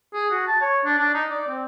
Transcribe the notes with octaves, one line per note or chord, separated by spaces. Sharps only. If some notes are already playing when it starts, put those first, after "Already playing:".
G#4
F#4
A5
C#5
D4
D4
D#4
D5
C4